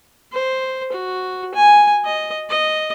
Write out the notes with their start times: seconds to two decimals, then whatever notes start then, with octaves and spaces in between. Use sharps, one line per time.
0.33 C5
0.92 F#4
1.55 G#5
2.05 D#5
2.49 D#5